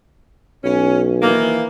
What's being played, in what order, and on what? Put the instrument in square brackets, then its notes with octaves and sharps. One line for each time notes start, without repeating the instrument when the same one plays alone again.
[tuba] B1 [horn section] C#4
[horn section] D#3 E3 A#3